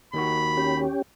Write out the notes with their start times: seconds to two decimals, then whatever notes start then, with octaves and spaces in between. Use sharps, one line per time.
0.14 D#2 D#3 F#4 B5
0.57 C#4 G4